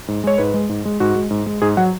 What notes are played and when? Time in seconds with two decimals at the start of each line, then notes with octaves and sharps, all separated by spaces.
0.08 G#2
0.24 G#3 C#5
0.38 G#2 B4
0.54 G#3
0.69 G#2
0.85 G#3
1.00 G#2 F#4
1.15 G#3
1.31 G#2
1.46 G#3
1.62 G#2 G#4
1.77 F#3 F#5